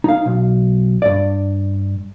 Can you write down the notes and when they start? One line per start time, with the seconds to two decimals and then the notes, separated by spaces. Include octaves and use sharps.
0.04 D#4 F5
0.26 B1
1.02 G2 D5